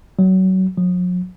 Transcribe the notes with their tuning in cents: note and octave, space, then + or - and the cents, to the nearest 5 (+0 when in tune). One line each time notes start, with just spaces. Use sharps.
F#3 +25
F#3 -45